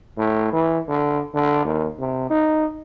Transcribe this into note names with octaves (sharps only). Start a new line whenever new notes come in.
A2
E3
D3
D3
D#2
C3
D#4